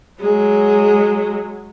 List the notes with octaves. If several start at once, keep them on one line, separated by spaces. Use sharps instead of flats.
F#3 G#3